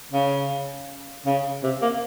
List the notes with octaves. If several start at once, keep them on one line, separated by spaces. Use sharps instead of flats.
C#3
C#3
C3
A#3